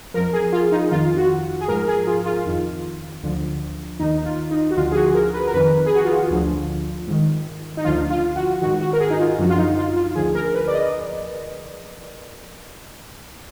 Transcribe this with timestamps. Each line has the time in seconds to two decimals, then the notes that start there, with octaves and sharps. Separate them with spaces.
0.14 F2 F3 A#4
0.33 G#4
0.53 F4
0.72 D#4
0.91 F2 D#3 F4
1.17 F#4
1.61 G#4
1.68 G#2 F3 A#4
1.88 G#4
2.07 F4
2.26 F4
2.46 F2 D#3
3.22 D2 D3 F3
3.99 D#2 D#3 D#4
4.25 F4
4.51 D#4
4.71 F#4
4.77 D2 D3 F3 F4
4.92 G#4
4.96 F#4
5.15 A#4
5.34 B4
5.47 A#4
5.54 F2 D#3 B4
5.86 G#4
5.95 F#4
6.05 F4
6.30 D2 D3 F3
7.07 G#2 D#3
7.77 D#4
7.85 D2 D3 F3 F4
8.10 F4
8.36 F#4
8.62 G#2 D#3 F#4
8.81 F#4
8.93 A#4
9.00 G#4
9.10 D#4
9.20 F4
9.39 F#2 D3 F3 F#4
9.49 F4
9.58 D#4
9.77 F4
9.97 F4
10.15 D2 D3 F3 G#4
10.35 A#4
10.54 B4
10.68 D5
10.74 D#5